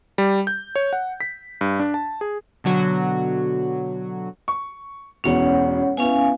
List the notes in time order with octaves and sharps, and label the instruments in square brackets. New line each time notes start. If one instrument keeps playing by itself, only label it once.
[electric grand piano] G3
G6
C#5
F#5
B6
G2
D4
A5
G#4
[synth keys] B2 D3 F#3 F#4
[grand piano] C#6
[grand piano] E1 E2 B2 [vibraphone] C#4 C#5 F#5
[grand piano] B3 E4 B4 [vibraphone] C#4 F5 G#5